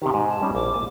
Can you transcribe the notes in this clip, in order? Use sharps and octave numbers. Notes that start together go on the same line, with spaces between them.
C3 D#3 G4
G#2
A5
G3 C#4 D#4
A#1 D6
A#3 G#5 A5